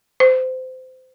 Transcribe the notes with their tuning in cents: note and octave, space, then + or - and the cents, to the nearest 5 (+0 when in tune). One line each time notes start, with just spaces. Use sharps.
C5 -25